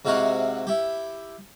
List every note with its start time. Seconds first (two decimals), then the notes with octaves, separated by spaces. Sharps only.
0.05 G#2 C3 E4 F#4 F5 F#5
0.67 E4 G4